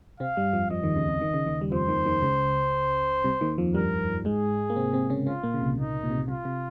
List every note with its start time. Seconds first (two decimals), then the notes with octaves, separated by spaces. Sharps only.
0.20 C3 C4 F5
0.37 G2 G3
0.53 F2 F3
0.71 F2 F3 D#5
0.83 D#2 D#3
0.96 C#2 C#3
1.08 C2 C3
1.21 D#3
1.34 C#3
1.46 D#2 D#3
1.61 G3
1.72 F2 F3 C5
1.88 D#2 D#3
2.06 D#2 D#3
2.22 C#2 C#3
3.24 C2 C3
3.41 D#2 D#3
3.58 F2 F3
3.74 G2 G3 A#4
4.25 G#2 G#3 G#4
4.70 A#3
4.76 C3 C4
4.93 C3 C4
5.10 C#3 C#4
5.26 C#3 C#4 F4
5.43 A#2 A#3
5.54 C#3
5.61 C2 C3
5.77 A#2 D#4
6.04 A#2
6.11 C3
6.18 A#2
6.28 C2 C3 F4
6.45 C3